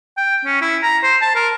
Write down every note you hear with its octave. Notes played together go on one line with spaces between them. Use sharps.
G5
C#4
E4
A#5
C5
A5
A#4